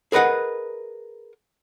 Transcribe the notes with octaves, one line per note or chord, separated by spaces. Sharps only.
G#4 A#4 B4 D#5 F#5